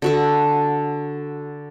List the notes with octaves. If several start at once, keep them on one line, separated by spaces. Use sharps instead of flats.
D3 F#4 A4